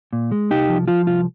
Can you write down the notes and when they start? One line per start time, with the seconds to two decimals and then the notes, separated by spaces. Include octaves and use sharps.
0.13 A#2
0.32 G#3
0.50 C2 D#4 G4
0.69 F3
0.88 F3 F4
1.07 C2 F4